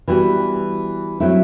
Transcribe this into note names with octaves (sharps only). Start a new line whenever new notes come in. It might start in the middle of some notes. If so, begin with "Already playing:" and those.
E3 G3 B3 F#4
F#3 A3 C4 E4